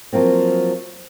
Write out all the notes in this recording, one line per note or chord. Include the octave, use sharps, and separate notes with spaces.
F3 F#3 A#3 C4